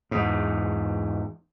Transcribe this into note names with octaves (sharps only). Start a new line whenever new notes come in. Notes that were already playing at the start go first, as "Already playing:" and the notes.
E2 G#2